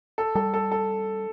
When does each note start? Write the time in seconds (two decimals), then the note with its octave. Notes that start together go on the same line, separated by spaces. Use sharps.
0.18 A4
0.35 G3 A4
0.54 A4
0.72 A4